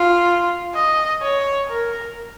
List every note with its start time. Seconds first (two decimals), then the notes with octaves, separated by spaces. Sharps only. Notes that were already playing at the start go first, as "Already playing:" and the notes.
Already playing: F4
0.75 D#5
1.22 C#5
1.69 A#4